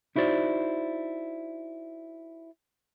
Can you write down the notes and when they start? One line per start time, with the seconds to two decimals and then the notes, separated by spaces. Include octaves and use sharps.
0.16 D#4 E4 F#4 C5 D5